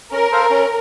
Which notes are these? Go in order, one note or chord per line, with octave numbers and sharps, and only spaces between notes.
C#4 A#4
A4 C5 F5
C#4